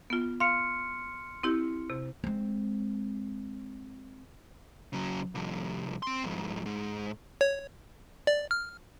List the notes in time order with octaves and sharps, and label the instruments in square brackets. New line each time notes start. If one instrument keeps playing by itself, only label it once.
[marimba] B3 F4
[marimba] F5 [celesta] C6 F6 C#7
[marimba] C4 E4 G4
C3
[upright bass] G#3 C4
[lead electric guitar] C#3 F#3
C2 F2
C4 C6
F2 G#2
G#2
[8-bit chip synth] C#5
D5
F6